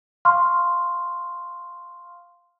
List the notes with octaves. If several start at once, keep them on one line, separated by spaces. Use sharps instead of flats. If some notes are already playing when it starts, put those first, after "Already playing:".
F5 C6 C#6 F6